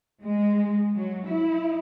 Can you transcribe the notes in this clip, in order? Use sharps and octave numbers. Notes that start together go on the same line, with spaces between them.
G#3
F#3
E4